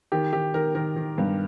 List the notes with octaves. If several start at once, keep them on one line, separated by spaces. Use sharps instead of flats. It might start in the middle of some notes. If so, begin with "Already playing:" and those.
D#3 G4
D#3 G4
D#3 A#4
D#3 A#4
D#3
G2